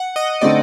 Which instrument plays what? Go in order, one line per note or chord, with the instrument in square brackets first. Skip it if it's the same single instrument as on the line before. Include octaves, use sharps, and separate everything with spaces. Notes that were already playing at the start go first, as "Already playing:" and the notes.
Already playing: [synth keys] F#5
D#5
[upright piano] D3 A3 C4 D#4 [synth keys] D5